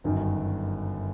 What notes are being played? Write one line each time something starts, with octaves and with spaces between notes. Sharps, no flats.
G1 F#2 D#3 F#3